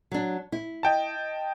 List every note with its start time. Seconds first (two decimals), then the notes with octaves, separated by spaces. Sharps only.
0.11 F#3 D4
0.52 E4
0.83 D#5 G5 A5